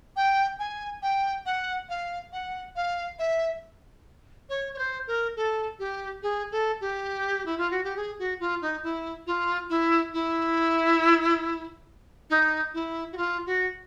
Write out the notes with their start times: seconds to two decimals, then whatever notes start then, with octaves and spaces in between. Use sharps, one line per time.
0.16 G5
0.59 G#5
1.02 G5
1.45 F#5
1.89 F5
2.32 F#5
2.75 F5
3.18 E5
4.49 C#5
4.74 C#5
4.78 C5
5.07 A#4
5.36 A4
5.79 G4
6.22 G#4
6.51 A4
6.80 G4
7.45 E4
7.58 F4
7.70 F#4
7.83 G4
7.96 G#4
8.18 F#4
8.39 F4
8.61 D#4
8.83 E4
9.26 F4
9.69 E4
10.13 E4
12.30 D#4
12.73 E4
13.12 F#4
13.17 F4
13.46 F#4